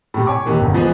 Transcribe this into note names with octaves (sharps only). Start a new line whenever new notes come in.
A2 C3
C#5 G#5 C#6 D6
D#2 C3 D#3 E3 A#3
G1 C#2
E3 F3 G#3 B3 G#4